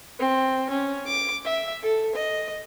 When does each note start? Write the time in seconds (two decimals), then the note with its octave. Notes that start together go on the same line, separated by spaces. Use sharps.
0.19 C4
0.70 C#4
1.07 D6
1.44 E5
1.82 A4
2.15 D#5